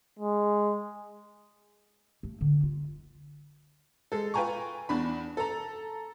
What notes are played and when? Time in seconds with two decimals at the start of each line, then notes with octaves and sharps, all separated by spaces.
0.20 G#3
2.23 A3
2.41 D3
2.63 F4
4.12 G#3 A4
4.34 F4 B4 G5 G#5 A#5 C#6
4.89 E2 D4 B5
5.37 A4 A#5